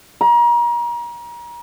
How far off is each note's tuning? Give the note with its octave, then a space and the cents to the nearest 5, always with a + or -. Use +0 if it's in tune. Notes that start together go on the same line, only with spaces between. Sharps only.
A#5 +35